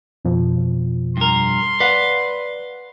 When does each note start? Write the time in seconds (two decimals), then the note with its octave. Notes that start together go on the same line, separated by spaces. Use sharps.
0.25 F2 B2 F3
1.17 G2 A#4 C6
1.80 B4 D5 F5 F#5